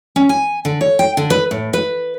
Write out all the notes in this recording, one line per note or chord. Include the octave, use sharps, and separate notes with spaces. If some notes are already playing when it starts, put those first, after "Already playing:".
C#4
G#5
D3
C#5
G5
D3
B4
A2
B4